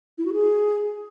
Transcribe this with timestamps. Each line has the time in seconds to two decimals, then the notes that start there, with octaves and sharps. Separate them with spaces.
0.18 E4
0.26 F#4
0.33 G#4